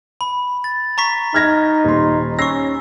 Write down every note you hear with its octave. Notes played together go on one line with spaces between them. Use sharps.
B5
A6
A#5 C#6 B6
D#4 F6 G#6 A#6
D#1 C6
C#4 C#6 E6 A#6 C7